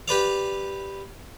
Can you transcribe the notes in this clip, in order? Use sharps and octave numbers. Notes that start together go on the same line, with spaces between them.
G4 B4 D5 F5